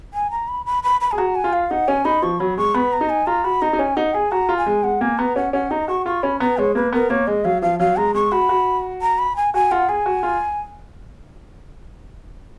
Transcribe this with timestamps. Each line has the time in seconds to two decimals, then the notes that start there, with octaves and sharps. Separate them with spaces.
0.14 G#5
0.31 A#5
0.48 B5
0.66 B5
0.83 B5
1.01 B5
1.11 G#4 G#5
1.18 F#4 A#5
1.35 G#5
1.44 F4
1.53 F5
1.70 D#4 F#5
1.88 C#4 G#5
2.05 D#4 B5
2.22 F3 C#6
2.40 F#3 B5
2.57 G#3 C#6
2.74 B3 B5
2.93 A#5
3.01 D#4
3.09 G#5
3.27 F4 A#5
3.44 F#4 B5
3.62 D#4 A#5
3.73 D#4
3.79 C#4 G#5
3.97 D#4 F#5
4.14 G#4 G#5
4.31 F#4 A#5
4.49 F4
4.57 G#5
4.66 G#3
4.84 G#3 F#5
5.01 A#3 G#5
5.18 B3 A#5
5.36 C#4 F#5
5.53 C#4 F#5
5.71 D#4 A#5
5.88 F#4 C#6
6.06 F4 C#6
6.22 C#4 B5
6.40 B3 A#5
6.58 G#3 C#5
6.75 A#3 B4
6.92 B3 A#4
7.10 A#3 C#5
7.27 G#3 D#5
7.45 F#3 F5
7.62 F3 F5
7.80 F#3 F5
7.97 G#3 A#5
8.15 G#3 C#6
8.32 F#4 B5
8.49 F#4
9.02 A#5
9.19 B5
9.36 G#5
9.54 F#4 G#5
9.71 F4 F#5
9.88 G#4 G#5
10.06 F#4
10.23 F4